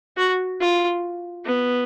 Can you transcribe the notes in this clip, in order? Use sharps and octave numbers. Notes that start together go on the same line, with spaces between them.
F#4
F4
B3